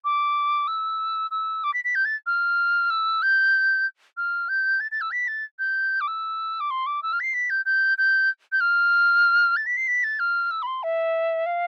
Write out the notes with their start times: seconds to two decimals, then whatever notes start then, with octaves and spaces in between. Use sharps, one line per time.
0.04 D6
0.67 E6
1.31 E6
1.64 D6
1.74 B6
1.84 B6
1.95 G6
2.05 A6
2.26 F6
2.90 E6
3.22 G6
4.17 F6
4.49 G6
4.80 A6
4.91 A6
5.01 E6
5.11 B6
5.28 A6
5.59 G6
6.01 D6
6.07 E6
6.60 D6
6.70 C6
6.86 D6
7.03 E6
7.13 F6
7.20 B6
7.23 C7
7.34 B6
7.50 G6
7.65 G6
7.98 G6
8.52 G6
8.61 F6
9.56 A6
9.66 B6
9.77 C7
9.88 B6
10.04 A6
10.19 F6
10.51 E6
10.62 B5
10.67 C6
10.83 E5
11.46 F5